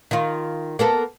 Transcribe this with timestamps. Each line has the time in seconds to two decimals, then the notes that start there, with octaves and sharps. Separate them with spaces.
0.11 D#3 F4
0.79 A#3 B3 A4